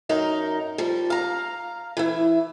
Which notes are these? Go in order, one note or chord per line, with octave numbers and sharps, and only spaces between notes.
F#2 D#4 A#4
F3 G3
F5 A#5
E3 E4